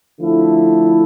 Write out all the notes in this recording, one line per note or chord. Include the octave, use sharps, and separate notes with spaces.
D3 F3 A3 E4 A4